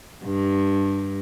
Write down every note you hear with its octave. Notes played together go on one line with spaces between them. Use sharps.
G2